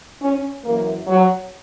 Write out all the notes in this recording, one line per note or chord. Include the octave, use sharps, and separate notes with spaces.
C#4
F#2 E3 A#3
F#3